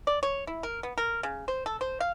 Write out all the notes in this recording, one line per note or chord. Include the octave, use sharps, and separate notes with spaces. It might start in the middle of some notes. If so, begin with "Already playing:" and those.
D5
C#5
E4
A#4
B3
A#4
C#3
C5
A4
C5
F5